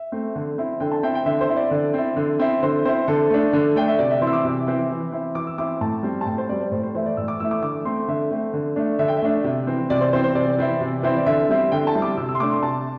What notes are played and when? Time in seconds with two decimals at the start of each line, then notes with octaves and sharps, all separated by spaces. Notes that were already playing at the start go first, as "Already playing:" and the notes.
Already playing: E5
0.12 A3 C4
0.36 D3
0.58 C4 E4
0.80 D3 G5
0.92 A5
1.03 C4 E4 G5
1.15 G5
1.26 D3 E5
1.41 C5
1.49 C4 E4
1.56 D5
1.71 D3
1.94 C4 E4
2.17 D3
2.39 C4 E4
2.63 D3 C5
2.85 C4 E4 C5
3.08 D3 A4
3.30 A3 D4
3.53 D3
3.76 A3 D4 G5
3.88 E5
3.99 C3 D5
4.11 E5
4.22 E3 C4 E4 C6
4.27 E6
4.33 D6
4.45 C3
4.67 E3 C4 E4
4.90 E3
5.12 C4 E4
5.35 E3 D6
5.47 E6
5.58 C4 E4 D6
5.81 A2 A5
6.03 G3 C4
6.21 A5
6.26 A2 G5
6.38 C5
6.49 G3 C4 D5
6.61 C5
6.71 A2 C5
6.83 C5
6.95 E3 A3 E4 C5
7.06 D5
7.17 A2 E6
7.28 D6
7.40 E3 A3 E4 E6
7.51 D6
7.62 D3 D6
7.85 A3 C4 C6
8.08 D3 E5
8.31 A3 C4
8.54 D3
8.76 A3 D4
8.99 D3 E5
9.08 G5
9.17 E5
9.22 A3 D4
9.44 C3
9.67 E3 C4
9.90 C3 D5
10.01 C5
10.13 E3 C4 C5
10.24 C5
10.35 C3 D5
10.58 E3 C4 E4
10.81 C3
11.03 E3 C4 E4 C5
11.17 D5
11.26 D3 E5
11.49 G3 C4 E4
11.72 D3 G5
11.87 A5
11.95 G3 C4 E4
12.02 D6
12.17 C3 E6
12.29 E6
12.35 C6
12.40 A3 D4 D6
12.51 C6
12.63 C3 A5